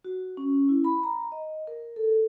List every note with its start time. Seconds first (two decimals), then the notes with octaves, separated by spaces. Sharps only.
0.04 F#4
0.37 C#4
0.69 E4
0.84 B5
1.03 A#5
1.32 D#5
1.67 A#4
1.96 A4